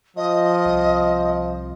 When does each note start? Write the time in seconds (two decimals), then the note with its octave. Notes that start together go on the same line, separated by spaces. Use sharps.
0.16 F3 D#5
0.65 C2